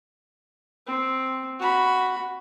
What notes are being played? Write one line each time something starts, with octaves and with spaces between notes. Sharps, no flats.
C4
F#4 B5